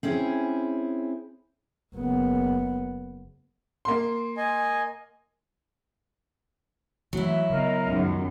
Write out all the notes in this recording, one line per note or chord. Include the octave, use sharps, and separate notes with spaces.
C4 C#4 E4 G#4
F#1 B3
A#3 C6
D#5 G#5
E3 F#3 A3 E4 E5
C#3 B3 A#4 D#5 F5
C#2 F#2 D#3